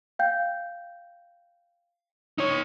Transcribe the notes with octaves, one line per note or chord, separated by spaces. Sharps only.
F5 G5 G6
D#4 C#5